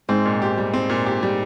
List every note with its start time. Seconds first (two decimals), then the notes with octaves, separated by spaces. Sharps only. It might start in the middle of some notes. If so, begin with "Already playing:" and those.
0.09 G#2 C4
0.25 A#2
0.42 G4
0.58 G3
0.74 C4
0.90 A#2
1.06 G4
1.23 G3